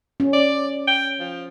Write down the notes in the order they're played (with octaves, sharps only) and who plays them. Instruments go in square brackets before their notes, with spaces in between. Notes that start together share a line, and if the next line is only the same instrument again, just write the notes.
[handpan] C#4
[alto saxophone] D5
G5
F3